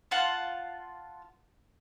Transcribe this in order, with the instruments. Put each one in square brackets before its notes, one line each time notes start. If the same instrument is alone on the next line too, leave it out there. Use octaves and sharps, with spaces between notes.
[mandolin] F4 F#5 A5